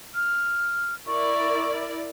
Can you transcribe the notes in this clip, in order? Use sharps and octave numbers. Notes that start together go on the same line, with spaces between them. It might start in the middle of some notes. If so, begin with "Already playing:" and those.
F6
E4 A#4 D5 C#6